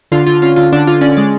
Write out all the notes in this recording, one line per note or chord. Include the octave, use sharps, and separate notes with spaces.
D3 F4
D3 F4
C#4 F4
D3 F4
D3 D4
D3 F4
C#4 D5
G#3 D5